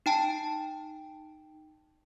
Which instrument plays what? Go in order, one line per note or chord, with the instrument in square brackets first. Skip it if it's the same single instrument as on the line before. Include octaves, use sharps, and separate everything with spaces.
[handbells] D#4 G5 A5